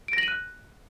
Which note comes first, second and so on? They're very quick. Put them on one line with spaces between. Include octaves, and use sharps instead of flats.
D7 A#6 F#7 D#7 F#6